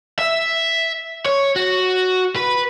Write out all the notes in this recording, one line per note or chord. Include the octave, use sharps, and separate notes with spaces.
E5
C#5
F#4
B4